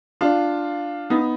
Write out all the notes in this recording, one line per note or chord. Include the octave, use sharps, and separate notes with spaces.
D4 F4
B3 D#4